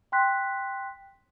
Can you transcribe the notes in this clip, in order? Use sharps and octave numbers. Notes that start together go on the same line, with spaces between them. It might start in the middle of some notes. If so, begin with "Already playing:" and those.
G5 C6 F#6 B6